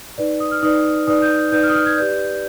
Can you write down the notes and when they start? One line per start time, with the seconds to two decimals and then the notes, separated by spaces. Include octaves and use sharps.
0.18 D#4 B4 D5
0.40 D#6
0.51 F6
0.63 D#4 B4 D5 D#6
1.07 D#4 B4 D5 D#6
1.22 G6
1.52 D#4 B4 D5 G6
1.63 F6
1.69 D#6
1.75 F6
1.86 G#6
1.97 G4 B4 D5 G6